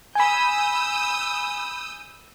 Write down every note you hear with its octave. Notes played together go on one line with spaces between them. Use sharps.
G#5 B5 D#6 E6 G6